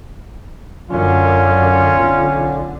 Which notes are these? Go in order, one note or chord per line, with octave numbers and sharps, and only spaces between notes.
F#2 D3 F#3 C#4 F4
B1 D3